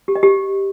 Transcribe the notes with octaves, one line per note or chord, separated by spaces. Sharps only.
G4
D#5
G4